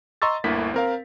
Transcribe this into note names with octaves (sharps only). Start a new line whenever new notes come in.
D#5 A#5 C6 C#6 E6 A6
G1 D2 A#3 E4 B6
C4 A#4 F5